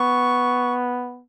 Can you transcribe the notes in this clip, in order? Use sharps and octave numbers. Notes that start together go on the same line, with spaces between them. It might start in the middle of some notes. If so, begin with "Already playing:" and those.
Already playing: B3 C#6